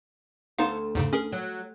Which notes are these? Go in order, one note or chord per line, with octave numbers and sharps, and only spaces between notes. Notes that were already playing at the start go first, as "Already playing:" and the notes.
D2 B3 D#4 A4 C5 F5
E2 G#2 C#3
C#4 G#4 A#4
F#3